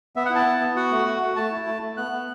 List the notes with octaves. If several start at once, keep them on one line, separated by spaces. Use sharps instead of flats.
B3 E5
F#5
E4
A5
B3
B3
F#4 F#5
A3
F#4
A3
A3 A5
E4
A3
A3
B3 F#6
B3